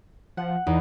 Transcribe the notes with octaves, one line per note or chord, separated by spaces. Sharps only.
F3 F#5
E2 D#4